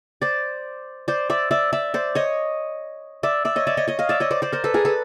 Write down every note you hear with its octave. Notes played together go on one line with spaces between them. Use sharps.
C5 D5
C5 D5
D5 E5
D5 E5
D5 E5
C5 D5
C#5 D#5
D5 E5
D5 E5
C#5 D#5
D5 E5
C#5 D#5
C#5 D#5
D#5 F5
D5 E5
C#5 D#5
C5 D5
C5 D5
A#4 C5
A4 B4
G#4 A#4
A4 B4